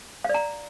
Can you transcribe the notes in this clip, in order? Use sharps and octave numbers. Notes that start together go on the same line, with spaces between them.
D5 F5 A#5